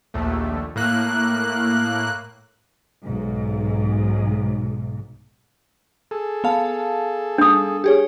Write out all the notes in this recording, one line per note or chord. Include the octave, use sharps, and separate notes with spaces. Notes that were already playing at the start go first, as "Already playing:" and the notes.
A#1 D#2 A3
A2 A#3 F#6
B1 G#2
G#4 A4
B3 F5 A5
D4 D#6
G4 G#4 C#5